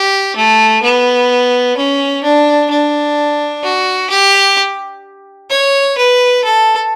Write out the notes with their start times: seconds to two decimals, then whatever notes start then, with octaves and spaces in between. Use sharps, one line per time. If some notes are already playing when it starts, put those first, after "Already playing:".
Already playing: G4
0.37 A3
0.82 B3
1.77 C#4
2.24 D4
2.70 D4
3.63 F#4
4.10 G4
5.50 C#5
5.98 B4
6.44 A4